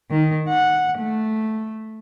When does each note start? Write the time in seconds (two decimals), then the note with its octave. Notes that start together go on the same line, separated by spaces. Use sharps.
0.11 D#3
0.49 F#5
0.99 A3